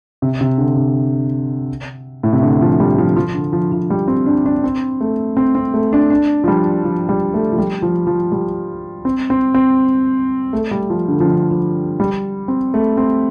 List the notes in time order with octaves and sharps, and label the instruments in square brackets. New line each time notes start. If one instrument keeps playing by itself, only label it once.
[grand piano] C3
C3
D3
C3
A2
C3
D3
F3
G3
F3
F3
D3
F3
F3
G3
C4
D4
D4
C4
A3
C4
C4
A3
D4
D4
F3
G3
F3
G3
A3
F3
G3
F3
F3
G3
C4
C4
C4
A3
G3
F3
D3
F3
D3
F3
G3
C4
A3
C4